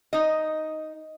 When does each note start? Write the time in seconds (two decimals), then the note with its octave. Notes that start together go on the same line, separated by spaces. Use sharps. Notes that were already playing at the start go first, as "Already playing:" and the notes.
0.13 D#4 D#5